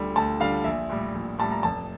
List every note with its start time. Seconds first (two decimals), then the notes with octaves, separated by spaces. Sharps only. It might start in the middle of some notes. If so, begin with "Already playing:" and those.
Already playing: D2 D3 G3
0.16 D2 A5
0.40 D3 G3 F5
0.64 A#1 E5
0.90 A2 G3
1.15 A#1
1.38 A2 G3 A5
1.52 A#5
1.63 F1 A5